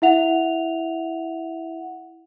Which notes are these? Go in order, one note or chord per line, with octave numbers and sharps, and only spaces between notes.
E4 E5 F#5 F7